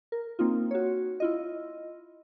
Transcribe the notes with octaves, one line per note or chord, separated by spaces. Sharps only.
A#4
A#3 C4 D#4 F4
F#4 C#5
E4 F4 D#5